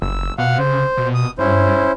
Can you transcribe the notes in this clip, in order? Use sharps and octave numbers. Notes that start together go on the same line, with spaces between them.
F#1 E6
B2 F5 F#5
C#3 C5
B2
D#6
G2 C#4 E4 C5